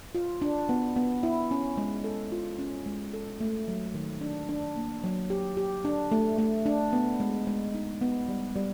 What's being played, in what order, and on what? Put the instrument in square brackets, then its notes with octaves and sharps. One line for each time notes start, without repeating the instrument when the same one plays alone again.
[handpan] F4
D4
B3
B3
E4
C#4
G#3
A4
F4
C#4
G#3
A4
A3
F#3
D#3
D4
D4
A#3
F#3
G4
G4
D4
A3
A3
D4
B3
G#3
G#3
D#4
B3
G3
G3